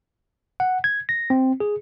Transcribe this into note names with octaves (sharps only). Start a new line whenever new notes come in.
F#5
G#6
A#6
C4
G#4